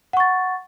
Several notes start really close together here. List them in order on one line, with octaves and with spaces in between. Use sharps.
F#5 C#6 A6